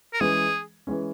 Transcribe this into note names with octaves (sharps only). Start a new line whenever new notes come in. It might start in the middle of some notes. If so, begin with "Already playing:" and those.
A#4
E3 G#3 C#4 G#4
E3 G#3 C#4